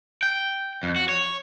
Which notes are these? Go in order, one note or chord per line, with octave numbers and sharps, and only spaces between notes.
G5
F2
F#4
C#5